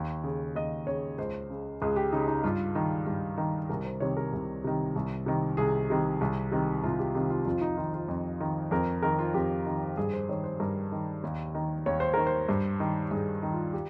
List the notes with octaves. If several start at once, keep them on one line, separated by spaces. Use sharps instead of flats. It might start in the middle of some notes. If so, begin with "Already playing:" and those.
Already playing: D#2
C#3
D#2 D#5
C#3 C#5
C#2 C5
C#3
C#2 G#4
G4
C#3 D#4
D#4
G2 F4
D#3
G2
D#3
C2 A#4
C5
C3 D#3 C#5
A#4
C2
C3 D#3
C2
C3 D#3
C2 G#4
C3 D#3
C2
C3 D#3
C2 F4
G4
C3 D#3
F4
F2 F4
D#4
D#3 F4
F4
F2
D#3
F2 A#4
D#3 A#4
F4
F2 G4
D#3
G2 G#4
C5
D#3 C#5
C5
G2 A#4
D#3
D#2
D#3
D#2 C#5
C5
D#3 A#4
C5
G2
D#3
G2 G#4
D#3
F4
G4